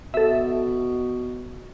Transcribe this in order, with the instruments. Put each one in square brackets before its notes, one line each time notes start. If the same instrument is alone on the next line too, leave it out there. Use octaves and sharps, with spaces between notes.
[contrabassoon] B2 [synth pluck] A4 E5